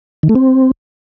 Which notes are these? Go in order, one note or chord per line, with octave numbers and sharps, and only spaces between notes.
D#3
A3
C4